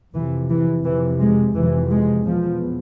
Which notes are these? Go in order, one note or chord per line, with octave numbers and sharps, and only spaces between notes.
F2 C3 E3
E3
F2 C3 E3
G#3
F2 C3 E3
G#3
E2 B2 F3